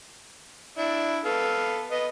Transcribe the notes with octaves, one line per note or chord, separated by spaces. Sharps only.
D4 E4
B3 A4 F5
B3 D#5